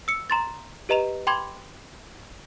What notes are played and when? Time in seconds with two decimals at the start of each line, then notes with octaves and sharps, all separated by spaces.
0.08 E6 C#7
0.30 A#5 C6 A6
0.89 G4 B4 D#5 A#5 D#7 F7
1.27 G5 B5 C6 D6 G#6